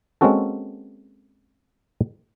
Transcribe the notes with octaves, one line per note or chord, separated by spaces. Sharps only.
G#3 A#3 C4 C#4 F#4 A4